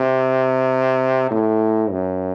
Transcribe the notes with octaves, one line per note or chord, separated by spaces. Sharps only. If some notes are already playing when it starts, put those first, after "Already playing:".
Already playing: C3
A2
F#2